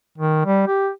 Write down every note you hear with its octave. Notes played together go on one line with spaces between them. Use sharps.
D#3
G3
G4